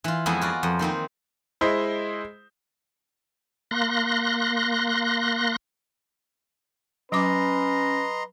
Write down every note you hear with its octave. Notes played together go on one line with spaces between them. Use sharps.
E3 F4
F2 G#3 B3 E4 G#5
F4 F#4 D5
F2
D#3 A#3 C4 D#4
G#3 E4 C5 D#5
A#3 C6 F#6 A#6
F#3 C#4 B4 D#5 A#5 C6 D6